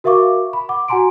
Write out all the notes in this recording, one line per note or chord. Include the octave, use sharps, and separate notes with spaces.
F#4 A#4 E5 F5 C#6 D6
B5
F#5 D6
F#4 F#5 G#5 A#5 C6 D7